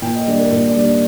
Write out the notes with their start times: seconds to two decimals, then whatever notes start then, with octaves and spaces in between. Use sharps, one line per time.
0.02 A#2 G5
0.14 D#5
0.26 G3 A#3 D4 D5
0.39 A#4
0.51 A#2 A#4
0.68 D5
0.75 G3 A#3 D4
0.83 D5